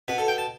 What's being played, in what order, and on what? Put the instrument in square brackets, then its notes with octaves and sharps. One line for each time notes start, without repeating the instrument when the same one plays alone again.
[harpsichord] B2 B4
A4
G5
A5